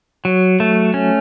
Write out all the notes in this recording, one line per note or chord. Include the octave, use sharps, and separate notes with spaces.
F#3
A3
C#4